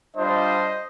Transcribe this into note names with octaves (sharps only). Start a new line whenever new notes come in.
G3 D4 F4 C5 D#5